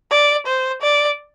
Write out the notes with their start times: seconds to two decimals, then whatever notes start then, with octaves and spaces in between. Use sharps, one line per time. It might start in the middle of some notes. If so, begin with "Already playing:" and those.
0.11 D5
0.46 C5
0.82 D5